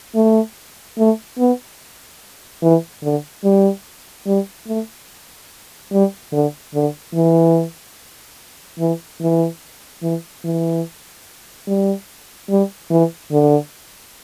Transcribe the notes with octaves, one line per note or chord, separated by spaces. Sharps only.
A3
A3
B3
E3
D3
G3
G3
A3
G3
D3
D3
E3
E3
E3
E3
E3
G3
G3
E3
D3